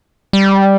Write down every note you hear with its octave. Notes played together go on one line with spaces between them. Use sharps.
G3